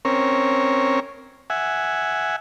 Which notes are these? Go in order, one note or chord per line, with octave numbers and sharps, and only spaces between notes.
C4 C#4 A#4 C#5
E5 F#5 G#5